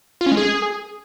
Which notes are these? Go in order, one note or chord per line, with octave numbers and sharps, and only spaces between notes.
F4
C#4
G#3
G#4